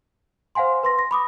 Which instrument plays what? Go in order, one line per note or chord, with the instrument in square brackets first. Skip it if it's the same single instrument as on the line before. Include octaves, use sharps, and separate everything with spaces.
[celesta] C5 F5 F#5 G#5 C6
B4 C6 A#6
A#6
B5 D6 D#6